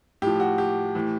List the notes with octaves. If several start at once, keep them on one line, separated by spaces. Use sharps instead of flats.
A2 F3 G4
F#4
G4
A2 E3